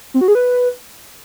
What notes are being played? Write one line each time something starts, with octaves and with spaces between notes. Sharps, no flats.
C4
F#4
G#4
B4